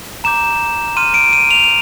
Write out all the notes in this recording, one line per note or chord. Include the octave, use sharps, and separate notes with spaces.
A#5 D6 G6 E7
C6 F6 D#7
D7
D#7
F7